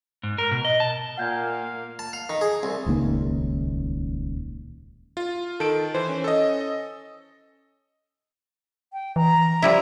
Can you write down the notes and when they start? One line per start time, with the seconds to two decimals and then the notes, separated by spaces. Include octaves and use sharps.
0.23 G#2
0.38 A#4
0.51 B2
0.65 D#5
0.80 A5
1.17 A#2 A#3 F5 F#5 G6 G#6
1.99 A5
2.13 F5
2.30 D#3
2.41 G#4
2.63 C2
2.86 D#1 C#2 D#3 A#3
5.17 F4
5.60 D#3 A4 D7
5.94 E3 C5
6.08 C#4
6.24 A4 D#5
8.93 G5
9.16 E3 A#5
9.62 F3 G3 E4